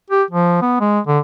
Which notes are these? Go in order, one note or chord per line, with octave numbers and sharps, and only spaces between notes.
G4
F3
B3
G#3
D3